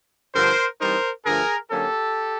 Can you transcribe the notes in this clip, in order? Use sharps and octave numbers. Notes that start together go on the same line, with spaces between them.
G2 D3 F3 A#4 C5
E3 G3 C4 D#4 A#4 C5
G2 D3 F3 A3 G#4 A#4
D3 F#3 A#3 C#4 G4 A4